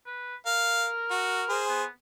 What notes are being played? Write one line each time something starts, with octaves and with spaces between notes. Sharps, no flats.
B4
A#4 F5
F#4
G#4 C5
B3